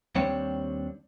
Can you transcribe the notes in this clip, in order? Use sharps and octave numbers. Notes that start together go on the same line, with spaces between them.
D#2 G3 C4 D4 C#5